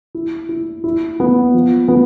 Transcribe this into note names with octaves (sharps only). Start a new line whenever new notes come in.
E4
E4
E4
B3
F3
B3